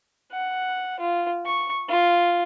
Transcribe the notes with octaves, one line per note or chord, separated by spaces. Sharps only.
F#5
F4
C#6
F4